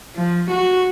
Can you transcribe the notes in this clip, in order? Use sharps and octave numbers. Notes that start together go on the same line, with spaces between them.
F3
F#4